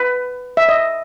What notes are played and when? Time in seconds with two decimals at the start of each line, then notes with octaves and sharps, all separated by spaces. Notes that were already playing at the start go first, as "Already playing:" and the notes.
Already playing: B4
0.57 E5
0.69 D#5